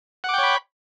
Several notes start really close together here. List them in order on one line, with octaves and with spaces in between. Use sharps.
F#5 D6 G5 C#5 B5